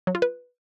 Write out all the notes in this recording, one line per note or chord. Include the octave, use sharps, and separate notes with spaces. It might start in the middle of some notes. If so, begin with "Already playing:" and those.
F#3
F4
B4